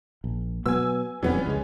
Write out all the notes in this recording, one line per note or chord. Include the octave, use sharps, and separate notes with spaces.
A#1
B2 F#3 B3 G#5 E6
E1 F2 E3 G3 B3 C#4
C#2 G#3 C#4